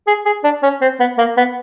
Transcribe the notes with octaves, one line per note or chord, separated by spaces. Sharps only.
G#4
G#4
D4
C#4
C4
B3
A#3
B3